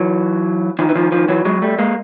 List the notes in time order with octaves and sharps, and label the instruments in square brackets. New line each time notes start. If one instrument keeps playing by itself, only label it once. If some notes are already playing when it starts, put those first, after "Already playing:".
Already playing: [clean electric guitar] E3 F#3
D#3 F3
E3
D#3 F3
D#3 F3
E3 F#3
F#3 G#3
G3 A3
G#3 A#3